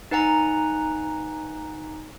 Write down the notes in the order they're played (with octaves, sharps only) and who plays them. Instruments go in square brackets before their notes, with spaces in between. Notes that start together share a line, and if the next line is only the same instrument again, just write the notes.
[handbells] D#4 B4 F#5 G#5 A#5